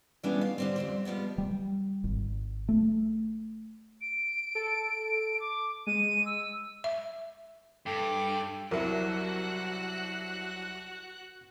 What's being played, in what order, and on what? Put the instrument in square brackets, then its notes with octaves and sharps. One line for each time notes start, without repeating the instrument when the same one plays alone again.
[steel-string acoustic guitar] E3 G3 G#3 B3 C#4 D4
F5
D3 G3 C4
F2 G3 C4
F3 G3 G#3 B3
[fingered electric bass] G3
G#1
A3
[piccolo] D7
[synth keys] A4
[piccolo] D6
[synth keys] G#3 [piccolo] D#7
[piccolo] E6
[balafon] E5
[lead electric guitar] G2 [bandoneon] A4 G5 D6
[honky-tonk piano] C2 E4 [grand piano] F#3 [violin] F#4 F#6 [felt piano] A#4